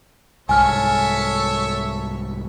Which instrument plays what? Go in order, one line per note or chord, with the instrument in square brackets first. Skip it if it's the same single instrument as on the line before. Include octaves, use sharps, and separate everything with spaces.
[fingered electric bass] C2 G#2 [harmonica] A4 C#5 E5 [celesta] G#5 F6